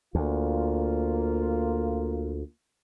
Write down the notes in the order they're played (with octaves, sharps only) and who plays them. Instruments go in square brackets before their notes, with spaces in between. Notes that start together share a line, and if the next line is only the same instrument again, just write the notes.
[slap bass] D2 [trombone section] A#3 F4